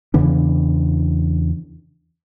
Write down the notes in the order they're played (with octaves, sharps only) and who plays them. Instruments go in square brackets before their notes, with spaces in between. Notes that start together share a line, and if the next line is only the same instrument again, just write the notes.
[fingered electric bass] E2 C#3 E3 D4